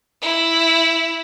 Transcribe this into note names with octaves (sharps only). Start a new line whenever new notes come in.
E4